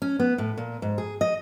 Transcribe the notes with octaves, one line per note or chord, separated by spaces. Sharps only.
C#4
B3
A2
A#2
G#2
G#4
D#5